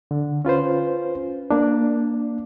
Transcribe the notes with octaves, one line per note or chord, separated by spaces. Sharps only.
D3
C#4 F4 B4 C5
A#3 D4